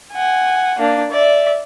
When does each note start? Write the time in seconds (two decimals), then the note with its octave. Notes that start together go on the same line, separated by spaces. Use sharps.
0.12 F#5 G#5
0.78 A#3 D4
1.11 D5 E5